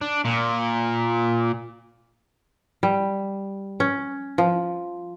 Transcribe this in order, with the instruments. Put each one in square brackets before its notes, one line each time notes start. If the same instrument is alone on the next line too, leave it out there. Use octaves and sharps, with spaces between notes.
[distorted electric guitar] D4
A#2
[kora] G3
C#4
F3